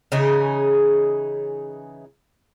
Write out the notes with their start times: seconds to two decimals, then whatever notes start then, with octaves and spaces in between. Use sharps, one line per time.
0.12 C#3 E3 D#4 G#4